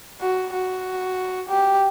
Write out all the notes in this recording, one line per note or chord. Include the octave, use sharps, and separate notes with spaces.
F#4
F#4
G4